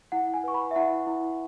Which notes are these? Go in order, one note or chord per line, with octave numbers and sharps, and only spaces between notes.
E4 F#5
G#5
B4 C#6
B5
E5
E4 F#5
E4